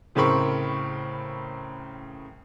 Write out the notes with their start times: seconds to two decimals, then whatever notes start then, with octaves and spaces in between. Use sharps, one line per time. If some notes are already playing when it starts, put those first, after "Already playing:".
0.15 A2 C#3 C4 A#4 B5 C#6